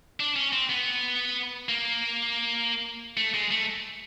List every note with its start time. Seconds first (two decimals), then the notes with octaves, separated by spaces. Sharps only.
0.20 D4
0.36 C#4
0.52 C4
0.70 B3
1.69 A#3
3.17 A3
3.34 G#3
3.51 A3